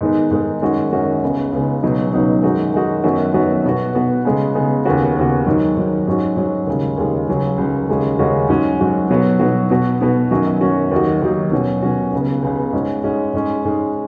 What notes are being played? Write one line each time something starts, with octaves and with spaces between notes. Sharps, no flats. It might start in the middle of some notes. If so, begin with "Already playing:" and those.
G#2 D#3 G#3 B3 D#4
G#2 D#3 G#3 B3 D#4
F#2 D#3 G#3 C#4 F#4
F#2 D#3 G#3 C#4 F#4
C#2 C#3 G#3 B3
C#2 C#3 G#3 B3
C#2 B2 F#3 B3 D#4
C#2 B2 F#3 B3 D#4
F#2 D#3 G#3 D#4 F#4
F#2 D#3 G#3 D#4 F#4
F#2 D#3 F#3 B3 F#4
F#2 D#3 F#3 B3 F#4
B2 B3 F#4
B2 B3 F#4
C#3 G#3 B3
C#3 G#3 B3
D#2 C#3 B3 F#4
D#2 C#3 B3 F#4
G#2 D#3 F#3
G#2 D#3 F#3
G#2 F#3 C#4 F#4
G#2 F#3 C#4 F#4
D#2 C#3 G#3
D#2 C#3 G#3
C#2 C#3 F#3
C#2 C#3 F#3
D#2 C#3 G#3 C#4 F#4
D#2 C#3 G#3 C#4 F#4
G#2 F#3 C#4 F#4
G#2 F#3 C#4 F#4
B2 F#3 B3 F#4
B2 F#3 B3 F#4
B2 B3 F#4
B2 B3 F#4
F#2 D#3 F#3 C#4 F#4
F#2 D#3 F#3 C#4 F#4
D#2 D#3 F#3 D#4 F#4
D#2 D#3 F#3 D#4 F#4
B2 F#3 C#4 F#4
B2 F#3 C#4 F#4
C#2 C#3 B3
C#2 C#3 B3
G#2 G#3 C#4 F#4
G#2 G#3 C#4 F#4
G#2 G#3 C#4
G#2 G#3 C#4